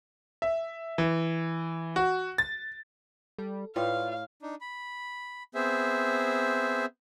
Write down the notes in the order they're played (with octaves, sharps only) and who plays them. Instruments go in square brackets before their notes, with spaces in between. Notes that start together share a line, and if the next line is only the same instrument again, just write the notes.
[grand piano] E5
E3
F#4
A6
[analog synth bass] G3 [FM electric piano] A4
[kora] A2 [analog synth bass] F4 [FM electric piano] B4 D5 G5 [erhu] F5
[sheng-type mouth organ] D4 D#4
B5
B3 C4 G#4 C5 E5